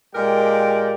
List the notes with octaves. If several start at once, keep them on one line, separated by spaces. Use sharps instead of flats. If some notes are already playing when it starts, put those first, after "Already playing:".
A#2 G#3 G4 A#4 D5 G5